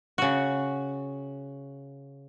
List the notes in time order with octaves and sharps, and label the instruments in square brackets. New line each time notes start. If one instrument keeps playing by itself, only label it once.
[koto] C#3 F#4